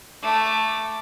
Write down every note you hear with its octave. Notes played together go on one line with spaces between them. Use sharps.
A3 D6